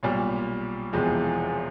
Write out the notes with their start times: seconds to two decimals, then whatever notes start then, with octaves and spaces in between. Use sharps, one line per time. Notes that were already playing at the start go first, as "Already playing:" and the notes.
0.03 B1 A#2 G3
0.93 E1 E2 C3 F3 G#3